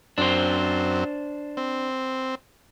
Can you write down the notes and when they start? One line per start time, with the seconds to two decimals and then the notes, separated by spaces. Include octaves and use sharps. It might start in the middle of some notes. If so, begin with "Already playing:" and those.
0.18 F#2 C4 D4 C5
1.57 C4